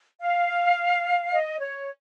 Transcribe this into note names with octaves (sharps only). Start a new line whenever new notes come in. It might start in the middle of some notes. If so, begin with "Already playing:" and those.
F5
D#5
C#5